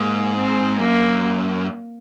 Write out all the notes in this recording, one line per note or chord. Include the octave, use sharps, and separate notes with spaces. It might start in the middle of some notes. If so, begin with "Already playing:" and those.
Already playing: G#2 A#3
C4
F#2 A#3